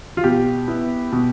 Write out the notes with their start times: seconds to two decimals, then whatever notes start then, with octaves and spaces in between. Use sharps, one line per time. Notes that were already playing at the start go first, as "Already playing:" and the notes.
0.17 F4
0.24 B2 G4
0.68 B3 E4
1.12 B2